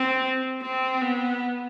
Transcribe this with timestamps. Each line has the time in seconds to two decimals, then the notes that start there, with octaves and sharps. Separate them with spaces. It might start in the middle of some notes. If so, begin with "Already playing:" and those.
Already playing: C4
0.62 C4
1.01 B3